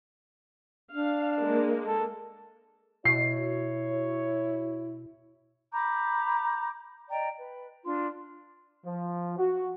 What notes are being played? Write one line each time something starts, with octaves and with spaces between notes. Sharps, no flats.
D4 F5
G#3 A#3
A4
B2 E4 C#5 C7
A#5 B5 D6 G6
D5 D#5 G5 A#5
B4
D4 F4 C6
F3
F#4